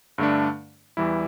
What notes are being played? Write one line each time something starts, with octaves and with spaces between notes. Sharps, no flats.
G2 D3 A3 D4
E2 E3 G3 E4